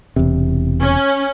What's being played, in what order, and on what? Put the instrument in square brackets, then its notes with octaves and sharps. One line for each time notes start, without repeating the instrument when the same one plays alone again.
[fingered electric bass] E1 E2 C3
[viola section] C#4